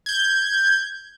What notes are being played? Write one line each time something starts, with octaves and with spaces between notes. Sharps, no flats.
G6 G#6